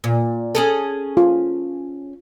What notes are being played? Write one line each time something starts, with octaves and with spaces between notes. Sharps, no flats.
A#2
C#4 G#4 A4
F4